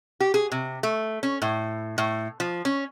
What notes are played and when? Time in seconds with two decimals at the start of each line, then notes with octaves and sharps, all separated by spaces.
0.20 G4
0.34 G#4
0.52 C3
0.83 A3
1.23 C#4
1.42 A2
1.98 A2
2.40 F3
2.65 C#4